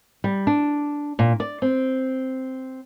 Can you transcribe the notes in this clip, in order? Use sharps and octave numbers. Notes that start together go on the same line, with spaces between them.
G3
D4
A#2
D5
C4